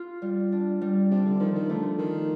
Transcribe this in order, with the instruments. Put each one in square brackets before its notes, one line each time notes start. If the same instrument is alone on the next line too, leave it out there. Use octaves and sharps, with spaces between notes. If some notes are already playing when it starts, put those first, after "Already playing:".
Already playing: [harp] F4
G3
D4
G3
[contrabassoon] C3 [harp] D4
[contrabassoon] D3
[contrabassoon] D#3 [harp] F3
[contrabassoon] D#3
[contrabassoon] D3 [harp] A3
[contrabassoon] D#3 [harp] F4